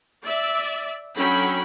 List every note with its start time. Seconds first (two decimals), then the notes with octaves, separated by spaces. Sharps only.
0.24 D5 E5
1.16 F#3 C#4 D4 A4 G5 B5